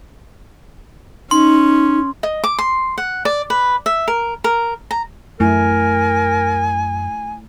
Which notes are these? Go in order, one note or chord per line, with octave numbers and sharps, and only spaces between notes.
C#4 D#4 C6
D#5
D6
C6
F#5
D5
B4
E5
A#4
A#4
A#5
F#2 A3 E4 A#4 G#5